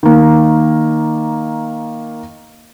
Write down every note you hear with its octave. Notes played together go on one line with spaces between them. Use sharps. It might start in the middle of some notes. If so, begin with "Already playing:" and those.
D#3 A#3